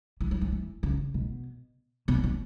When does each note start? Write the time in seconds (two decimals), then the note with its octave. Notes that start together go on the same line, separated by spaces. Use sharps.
0.20 E3
0.31 F#3
0.41 E3
0.52 E3
0.83 C#3
1.14 B2
2.08 B2
2.24 B2